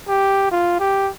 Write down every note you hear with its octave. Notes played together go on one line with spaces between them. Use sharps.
G4
F4
G4